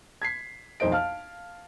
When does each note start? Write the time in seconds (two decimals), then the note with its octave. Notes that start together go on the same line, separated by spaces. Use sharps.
0.22 G#6 B6 C7
0.80 B1 F2 D#4 C5 D#5 D7
0.92 F5 A5 F6